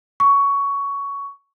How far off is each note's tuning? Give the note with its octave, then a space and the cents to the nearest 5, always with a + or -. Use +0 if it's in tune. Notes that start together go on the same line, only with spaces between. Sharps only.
C#6 +15